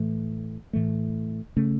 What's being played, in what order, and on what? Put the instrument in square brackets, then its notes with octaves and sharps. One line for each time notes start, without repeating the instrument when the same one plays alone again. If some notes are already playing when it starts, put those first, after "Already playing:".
Already playing: [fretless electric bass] A2 E3 A3
A2 E3 A3
C#3 A3 C#4